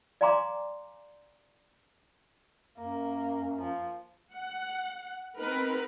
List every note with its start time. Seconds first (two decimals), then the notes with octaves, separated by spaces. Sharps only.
0.21 D5 F5 G#5 A#5 C6 D6
2.79 F#2 A#3
3.59 F3
4.33 F#5
5.38 B3 C4 D#4 A#4 B4